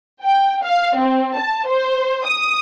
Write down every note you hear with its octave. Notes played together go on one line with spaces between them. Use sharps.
G5
F5
C4
A5
C5
D#6